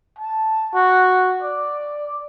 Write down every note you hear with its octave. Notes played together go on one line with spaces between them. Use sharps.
A5
F#4
D5